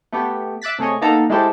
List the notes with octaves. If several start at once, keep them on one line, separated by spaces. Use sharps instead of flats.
A3 B3 G4
E5 D6 F#6 A6 B6
C3 A3 G#4 C#5 D#5
A#3 B3 D#4 A4 A#5
G#3 A3 E4 G4 A4 C5